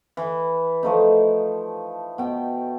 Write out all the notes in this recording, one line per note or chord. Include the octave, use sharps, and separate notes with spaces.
E3
F3 A3 D#4
B2 G5